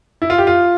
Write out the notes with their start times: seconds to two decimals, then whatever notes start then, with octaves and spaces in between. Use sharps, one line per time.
0.22 E4
0.30 F4
0.38 G4
0.47 F4